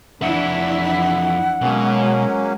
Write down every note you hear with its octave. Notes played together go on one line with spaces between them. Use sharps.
F2 E3 D4 E4 E5 F#5
B2 F#3 G#3 A#3 C#4